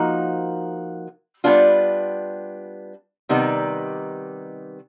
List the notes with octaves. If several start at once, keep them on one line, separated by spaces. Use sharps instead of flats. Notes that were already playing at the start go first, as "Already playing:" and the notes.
Already playing: F3 A#3 D#4 F#4 A#4
G3 B3 D4 F4
C3 D#3 G3 B3 D#4